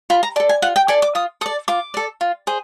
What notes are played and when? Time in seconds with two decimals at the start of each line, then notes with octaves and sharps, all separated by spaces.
0.10 F4 B5
0.23 A#5
0.36 D5 A5
0.40 A4
0.49 G#5
0.62 F4 F#5
0.76 G5
0.88 A4 D5 G#5
1.02 D6
1.15 F4 D#6
1.41 A4 D#6
1.46 D5
1.68 F4 D6
1.94 A4 D5
2.21 F4
2.47 G#4 C5